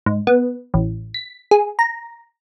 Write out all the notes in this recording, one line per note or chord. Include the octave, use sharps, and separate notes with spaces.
G#2
B3
A1
B6
G#4
A#5